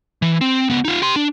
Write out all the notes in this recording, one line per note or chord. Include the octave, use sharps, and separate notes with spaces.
E3
C4
C#2 B3
D#4 F4
G4 C6
D4